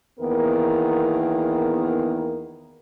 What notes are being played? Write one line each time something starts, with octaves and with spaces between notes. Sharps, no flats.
E2 D#3 A#3 B3 A#4